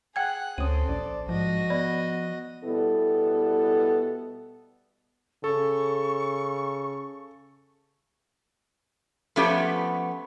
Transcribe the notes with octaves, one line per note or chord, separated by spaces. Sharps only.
G#4 F#5 G5 F#6 G#6
D2 C4 C#4 A4 D#6 D#7
A#1 D5
G#2 F3 F#4 D#5
B3 D5 B5
B2 G3 B3 E4 A4
C#3 A4 C#6
F3 A3 B3 C#4 G4